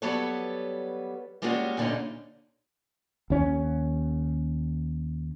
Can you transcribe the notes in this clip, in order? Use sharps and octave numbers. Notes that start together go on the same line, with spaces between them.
F#3 G3 B3 A4 B4 C#5
G3 G#3 A#3 C#4 F4 F#4
D2 A#2 D3 G3 C#4 D#4
D#2 C#4